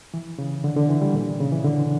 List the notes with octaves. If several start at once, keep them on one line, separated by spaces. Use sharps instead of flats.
E3
C#3
D3
D3
E3
G3
A#2
C#3
E3
D3